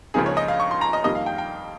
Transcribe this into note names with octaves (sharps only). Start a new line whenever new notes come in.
C#2 C#3 F3 A#3 D#4 G#4
C#5
D#5
F5
C#6
C6
A#5
D#5
F2 D#3 G3 A#3 D#5
F5
G5
G5